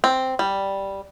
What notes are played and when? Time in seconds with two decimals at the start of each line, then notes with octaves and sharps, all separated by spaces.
0.04 C4
0.39 G3